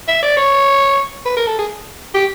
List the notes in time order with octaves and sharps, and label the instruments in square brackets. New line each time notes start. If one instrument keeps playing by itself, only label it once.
[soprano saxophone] E5
D5
C#5
B4
A#4
A4
G#4
G4